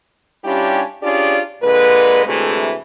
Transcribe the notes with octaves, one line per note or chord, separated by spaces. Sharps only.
G3 C#4 D4 E4 F4 G4
C#4 D4 F4 G4 G#4 D5
A#2 D3 G#3 A#3 B4
D2 C3 E3 G#3 A3